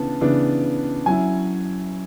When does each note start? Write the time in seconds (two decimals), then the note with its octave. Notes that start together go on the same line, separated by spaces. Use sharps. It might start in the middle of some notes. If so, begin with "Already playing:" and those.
Already playing: C#3 E3 B3 D4 A5
0.21 C#3 E3 B3 D4
1.06 F#3 C#4 E4 G#5